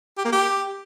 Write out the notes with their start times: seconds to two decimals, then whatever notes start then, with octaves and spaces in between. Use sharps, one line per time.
0.18 G4
0.25 A#3
0.32 G4